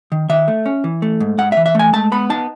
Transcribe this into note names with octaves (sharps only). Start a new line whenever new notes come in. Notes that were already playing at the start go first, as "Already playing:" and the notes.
D#3
D#3 E5
A3
C#4
E3
A3
G#2
G#2 F#5
E5
E3
E5
A3 G#5
G#3 A5
B3 B5
D#4 A5